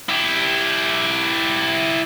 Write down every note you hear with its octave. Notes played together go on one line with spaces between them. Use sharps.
E4 G4